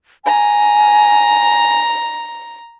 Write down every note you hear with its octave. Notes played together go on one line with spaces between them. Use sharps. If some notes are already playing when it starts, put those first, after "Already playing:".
G#5 A#5